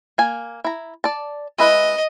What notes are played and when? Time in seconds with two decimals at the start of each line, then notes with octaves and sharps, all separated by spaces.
0.18 A#3 G#5
0.64 E4 A#5
1.04 D5 A5
1.58 G#3 E4 B4 D#5